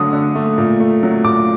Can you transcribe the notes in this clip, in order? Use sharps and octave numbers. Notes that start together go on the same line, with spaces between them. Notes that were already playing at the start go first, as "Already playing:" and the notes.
Already playing: D3 F#3 A3 D#6
D3
A3
A#2
A3
F#3
A#2 D6